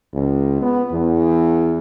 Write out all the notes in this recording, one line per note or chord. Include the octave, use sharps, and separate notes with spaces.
C#2
B3
E2